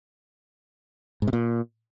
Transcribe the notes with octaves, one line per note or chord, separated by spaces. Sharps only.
G#2
C3
A#2